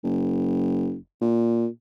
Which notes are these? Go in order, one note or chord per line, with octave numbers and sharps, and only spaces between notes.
F#1
A#2